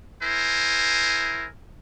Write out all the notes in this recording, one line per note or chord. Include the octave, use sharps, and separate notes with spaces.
E4 A#4 C5 G#5